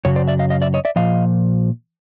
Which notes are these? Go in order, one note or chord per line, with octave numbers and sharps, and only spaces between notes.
F#2 C#3 F#3 C#5
C5 D5
D5 E5
D#5 F5
D#5 F5
D5 E5
C#5 D#5
D5 E5
A#2 F3 D#5 F5